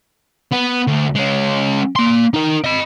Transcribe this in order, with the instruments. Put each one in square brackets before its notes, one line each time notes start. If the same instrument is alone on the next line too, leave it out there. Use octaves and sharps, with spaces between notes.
[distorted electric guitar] B3
D2
G#3 C#4
A#3 C6
D#4 A#4
D#5 B5